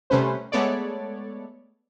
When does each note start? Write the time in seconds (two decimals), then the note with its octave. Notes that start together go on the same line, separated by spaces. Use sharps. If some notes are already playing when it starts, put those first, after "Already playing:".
0.10 C3 G3 A3 C#4 B4 C5
0.52 G#3 A3 B3 A4 C#5 D5